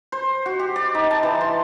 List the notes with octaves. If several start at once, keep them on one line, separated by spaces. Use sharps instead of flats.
C5
F#4
G4
D5
D#4
A5
E3
C6